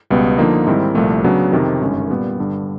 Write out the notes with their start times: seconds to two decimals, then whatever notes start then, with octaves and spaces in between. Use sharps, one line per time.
0.10 C#2 B2 G3 B3
0.38 D3 F3 A#3 D#4
0.67 G#2 D#3 G3 C4 E4
0.95 C2 A#2 F3 A3
1.24 C#3 F#3 B3 D4 F#4
1.52 F2 C3 D#3
1.81 G1 F#2 D#3 G#3 C#4
2.10 A#2 G3 B3
2.39 G2 D3 G3